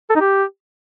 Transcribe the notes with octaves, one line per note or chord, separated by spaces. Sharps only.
A4
D#4
G4